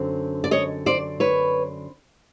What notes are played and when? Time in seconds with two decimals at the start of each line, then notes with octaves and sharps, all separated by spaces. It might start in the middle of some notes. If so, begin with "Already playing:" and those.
Already playing: F#2 D3 C4
0.44 D5
0.51 C#5 D#5
0.86 C5 D5
1.20 B4 C#5